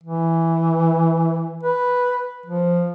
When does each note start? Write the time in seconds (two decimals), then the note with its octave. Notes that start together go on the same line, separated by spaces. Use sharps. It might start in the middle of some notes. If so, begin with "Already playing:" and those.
0.04 E3
1.63 B4
2.46 F3